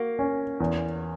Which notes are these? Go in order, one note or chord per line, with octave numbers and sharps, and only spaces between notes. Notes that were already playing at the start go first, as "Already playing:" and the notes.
Already playing: A#3 F#4
C#4
E2